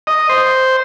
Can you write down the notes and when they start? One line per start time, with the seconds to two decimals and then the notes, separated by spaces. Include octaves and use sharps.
0.07 D#5
0.29 C5